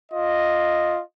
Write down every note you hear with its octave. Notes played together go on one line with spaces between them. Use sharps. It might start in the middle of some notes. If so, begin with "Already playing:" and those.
F4 D#5